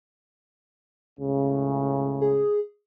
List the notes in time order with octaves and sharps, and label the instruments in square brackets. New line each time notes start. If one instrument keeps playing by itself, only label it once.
[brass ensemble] C#2 A2 C#3
[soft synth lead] G#4